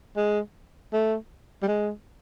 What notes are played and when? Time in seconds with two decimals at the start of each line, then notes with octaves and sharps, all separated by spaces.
0.17 G#3
0.93 A3
1.62 G3
1.68 G#3